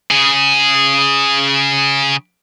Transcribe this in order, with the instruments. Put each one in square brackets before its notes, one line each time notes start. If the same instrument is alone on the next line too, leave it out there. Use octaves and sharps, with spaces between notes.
[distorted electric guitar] C#3 G#4